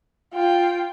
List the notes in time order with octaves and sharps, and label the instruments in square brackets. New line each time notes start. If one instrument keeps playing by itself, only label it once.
[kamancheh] F4 G5